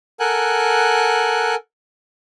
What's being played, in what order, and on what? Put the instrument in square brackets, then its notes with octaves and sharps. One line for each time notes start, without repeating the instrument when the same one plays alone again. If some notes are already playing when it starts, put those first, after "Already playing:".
[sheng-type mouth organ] A4 A#4 F#5 G#5 F#6